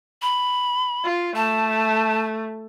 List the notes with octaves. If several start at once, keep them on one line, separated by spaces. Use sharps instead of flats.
B5
F4
A3 A5